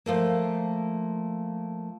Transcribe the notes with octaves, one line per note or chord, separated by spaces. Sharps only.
F3 A3 A#3